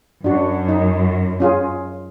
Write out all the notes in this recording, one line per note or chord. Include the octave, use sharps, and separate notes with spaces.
F#2 D4 F#4
D#4
C#4 F4 G#4